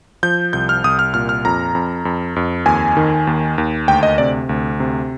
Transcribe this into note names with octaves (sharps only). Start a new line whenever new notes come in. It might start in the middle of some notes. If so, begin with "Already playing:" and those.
F3 G6
C2 G6
F6
C2 D#6
F6
A#2 F6
F6
F2 A#5
F2
F2
F2
D#2 G#5
D#3
D#2
D#2
D2 G5
D#5
C3 D5
D2
C3